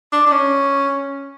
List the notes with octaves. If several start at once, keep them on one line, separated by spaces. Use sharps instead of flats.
D4
D4
C#4